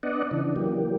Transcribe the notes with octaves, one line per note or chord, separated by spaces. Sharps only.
B3 D4 D5 D#5 F#5
C#3 E3 D4
E3 F#3 A#3 G4